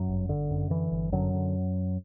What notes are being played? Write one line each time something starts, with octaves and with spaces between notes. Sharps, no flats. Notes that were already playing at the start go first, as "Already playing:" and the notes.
Already playing: F#2 F#3
G1
G1 D3
F#2
D3 E3
G1
F#2 D3 F#3
D3